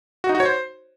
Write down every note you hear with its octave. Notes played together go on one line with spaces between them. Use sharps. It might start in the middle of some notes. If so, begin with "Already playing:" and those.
F#4
D#4
F#4
C#5
C5